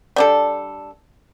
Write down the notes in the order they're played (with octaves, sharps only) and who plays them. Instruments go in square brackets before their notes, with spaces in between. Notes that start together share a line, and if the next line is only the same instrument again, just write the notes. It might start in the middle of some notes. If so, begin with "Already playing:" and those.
[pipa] G3 D4 A4